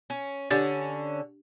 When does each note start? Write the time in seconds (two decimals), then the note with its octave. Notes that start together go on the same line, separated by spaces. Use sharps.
0.10 C#4
0.50 D3 C#4 D4 G4 A6